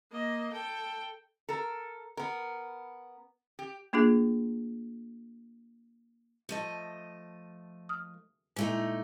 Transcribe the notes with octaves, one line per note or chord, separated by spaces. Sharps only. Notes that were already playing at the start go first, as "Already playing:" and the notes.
A#3 D#5
A4 G5
A4 A#4
B3 A#4
G4
A3 A#3 D4 F4 G#4
F3 A3 D#5
D#6 F6
A#2 G#3 A3 D#4 E4